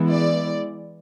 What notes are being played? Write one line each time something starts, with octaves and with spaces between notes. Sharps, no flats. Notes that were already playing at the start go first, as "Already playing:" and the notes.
Already playing: E3 G#3 B3 E4
D5